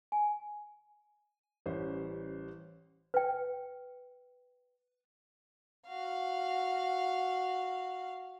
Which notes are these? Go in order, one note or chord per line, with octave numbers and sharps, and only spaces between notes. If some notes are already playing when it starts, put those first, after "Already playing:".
G#5
A1 G3 C#4 C5
B4 G5
F#4 F5